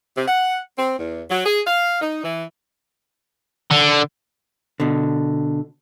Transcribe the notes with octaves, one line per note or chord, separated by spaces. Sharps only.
C3
F#5
C4
E2
F#3
G#4
F5
D#4
E3
D3
B2 D3